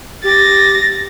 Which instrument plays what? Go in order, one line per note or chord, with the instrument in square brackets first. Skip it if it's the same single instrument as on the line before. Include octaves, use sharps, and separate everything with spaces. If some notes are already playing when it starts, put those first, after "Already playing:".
[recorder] G4 [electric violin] A6 A#6